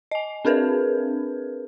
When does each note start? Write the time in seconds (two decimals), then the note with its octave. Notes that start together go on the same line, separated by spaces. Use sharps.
0.11 D#5 G#5
0.45 C4 D4 G#4 A#4 B4